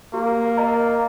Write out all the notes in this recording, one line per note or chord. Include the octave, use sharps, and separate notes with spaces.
A#3 G4
A#4 D#5 A#5